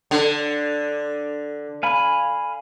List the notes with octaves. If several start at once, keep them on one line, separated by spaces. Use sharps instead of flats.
D3
F5 G#5 B5